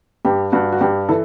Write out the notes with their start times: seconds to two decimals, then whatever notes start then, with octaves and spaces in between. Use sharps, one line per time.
0.25 G2 G4
0.52 G2 F#4
0.72 F#4
0.80 G2 G4
1.09 E3 A4